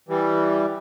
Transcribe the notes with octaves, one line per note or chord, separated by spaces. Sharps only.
E3 G3